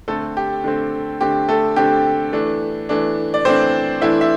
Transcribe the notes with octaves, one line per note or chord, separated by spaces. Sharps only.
D3 A3 C4 A4
G4
D3 A3 C4
D3 A3 C4 G4
A3 A4
D3 A3 C4 G4
E3 A3 D4
E3 A3 D4
D5
E3 A3 C4 D4 C5
E3 A3 D4 E4 E5
E5